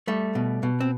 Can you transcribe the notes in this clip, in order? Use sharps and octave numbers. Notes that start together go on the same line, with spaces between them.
G3 A3
B2
B2
C4